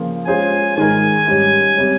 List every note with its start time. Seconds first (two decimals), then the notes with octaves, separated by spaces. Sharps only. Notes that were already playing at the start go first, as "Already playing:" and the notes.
Already playing: C#3 F3 A#3
0.26 G#3 C#4 F4 G#4 C5 G#5
0.76 G#2 D#3 G#3 D#4 A#4 G#5
1.27 G#2 G3 C#4 G4
1.77 C3 G3 C#4